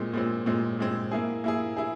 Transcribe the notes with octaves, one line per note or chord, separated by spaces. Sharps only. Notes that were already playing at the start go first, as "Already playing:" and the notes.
Already playing: A#2 G#3 C4
A#2 G#3 C4
A#2 G#3 C4
A#2 G#3 C4
A#3 E4 G#4
A#3 E4 G#4
E4 G#4